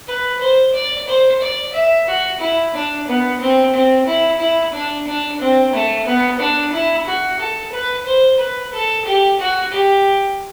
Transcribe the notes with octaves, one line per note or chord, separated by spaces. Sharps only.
B4
C5
D5
C5
D5
E5
F#4
E4
D4
B3
C4
C4
E4
E4
D4
D4
C4
A3
B3
D4
E4
F#4
A4
B4
C5
B4
A4
G4
F#4
G4